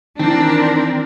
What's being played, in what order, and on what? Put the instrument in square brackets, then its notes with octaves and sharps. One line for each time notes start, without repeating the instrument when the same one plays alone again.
[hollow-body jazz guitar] D#3 E3 [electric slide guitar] C4 [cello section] D4 A#4